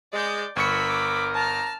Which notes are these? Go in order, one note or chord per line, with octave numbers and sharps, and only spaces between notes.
G#3 D5 G6
G1 A#4 B5 C#6 E6 C#7
D6
A5 A#5 F6